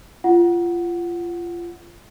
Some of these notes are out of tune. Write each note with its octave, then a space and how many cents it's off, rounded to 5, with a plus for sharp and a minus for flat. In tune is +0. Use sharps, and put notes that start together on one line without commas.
F4 -20 F#5 +0